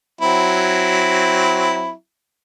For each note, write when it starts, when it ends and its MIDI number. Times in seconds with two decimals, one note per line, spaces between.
0.21 1.92 54
0.21 1.92 60
0.21 1.92 64